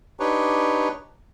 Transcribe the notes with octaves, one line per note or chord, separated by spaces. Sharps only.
D4 D#4 G4 B4 C#5